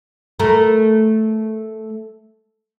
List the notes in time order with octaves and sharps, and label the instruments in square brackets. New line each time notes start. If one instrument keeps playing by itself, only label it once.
[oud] A3 A#4